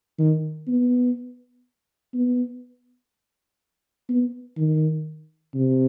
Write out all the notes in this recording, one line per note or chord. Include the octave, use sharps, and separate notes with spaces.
D#3
B3
B3
B3
D#3
C3